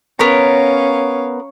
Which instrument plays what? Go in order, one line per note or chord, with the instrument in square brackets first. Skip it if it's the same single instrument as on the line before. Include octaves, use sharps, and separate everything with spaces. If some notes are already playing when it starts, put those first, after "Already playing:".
[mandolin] B3 A#4 A#5 [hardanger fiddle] C#4 F5 [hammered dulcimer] C#5